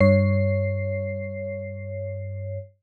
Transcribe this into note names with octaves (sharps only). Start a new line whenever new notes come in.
G2 C#5 C7